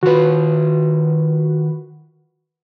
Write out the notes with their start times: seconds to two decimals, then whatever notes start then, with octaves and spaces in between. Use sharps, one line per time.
0.03 D#3 F4 F#4 B4